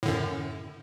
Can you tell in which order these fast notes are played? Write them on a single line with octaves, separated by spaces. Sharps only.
A2 D3 F#2